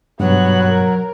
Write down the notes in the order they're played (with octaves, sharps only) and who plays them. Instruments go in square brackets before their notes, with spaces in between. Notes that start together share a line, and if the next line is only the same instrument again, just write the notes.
[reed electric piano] G2 B2 [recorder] F#3 [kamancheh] B3 F#6
[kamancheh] A#4